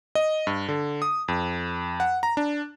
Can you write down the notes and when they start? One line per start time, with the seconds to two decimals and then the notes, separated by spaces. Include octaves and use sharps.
0.15 D#5
0.47 G2
0.69 D3
1.02 D#6
1.28 F2
2.00 F#5
2.23 A#5
2.37 D4